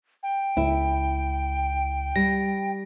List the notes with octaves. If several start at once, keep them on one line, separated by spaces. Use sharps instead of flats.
G5
C#2 E4
G3 A#6